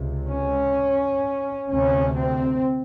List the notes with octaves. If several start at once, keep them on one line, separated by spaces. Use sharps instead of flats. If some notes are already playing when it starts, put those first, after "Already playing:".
Already playing: C#2 C3
C#4
D2 C3 C#4
C4